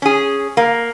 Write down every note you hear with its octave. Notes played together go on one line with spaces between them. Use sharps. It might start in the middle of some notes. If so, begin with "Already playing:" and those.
C#4 G#4
A#3